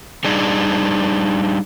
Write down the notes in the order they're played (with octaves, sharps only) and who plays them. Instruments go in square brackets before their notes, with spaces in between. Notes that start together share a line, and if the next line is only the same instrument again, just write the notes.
[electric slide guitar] G3 D4 D#4 G#4